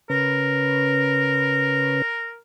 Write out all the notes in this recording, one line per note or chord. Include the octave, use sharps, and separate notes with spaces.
C#3 C#4 A#4 B4